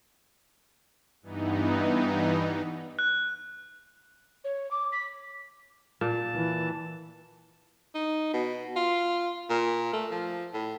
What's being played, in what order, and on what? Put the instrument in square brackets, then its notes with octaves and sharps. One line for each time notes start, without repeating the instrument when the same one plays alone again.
[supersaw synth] G2 E3 B3 D#4
[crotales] F#6
[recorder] C#5
D6
B6
[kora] A#2 A#3 [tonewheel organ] A5
[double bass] E3
[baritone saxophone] D#4
B2
F4
A#2
A3
F3
A2